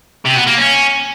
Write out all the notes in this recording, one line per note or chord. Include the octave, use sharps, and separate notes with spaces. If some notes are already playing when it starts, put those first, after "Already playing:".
C3
B3
A#3
C#4